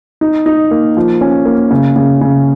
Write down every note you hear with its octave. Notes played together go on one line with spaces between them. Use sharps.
D#4
D#4
A#3
F3
C#4
A#3
C#3
C#3
C#3